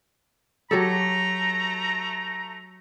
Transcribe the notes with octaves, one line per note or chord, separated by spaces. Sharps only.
F#3 A3 G4 A4 A#5